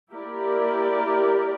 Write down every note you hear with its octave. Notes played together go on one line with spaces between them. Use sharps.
A#3 E4 G4 A#4 D5